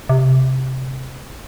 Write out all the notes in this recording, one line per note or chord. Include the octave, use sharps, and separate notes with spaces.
C3